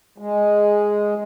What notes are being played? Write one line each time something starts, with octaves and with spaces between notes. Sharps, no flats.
G#3